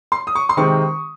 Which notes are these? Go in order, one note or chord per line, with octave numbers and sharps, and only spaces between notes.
C6
D#6
C#6
C6
C3 D#3 G#3 C4 C#6